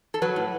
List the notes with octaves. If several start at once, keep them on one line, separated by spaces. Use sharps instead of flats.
A4
F#3 B4
A2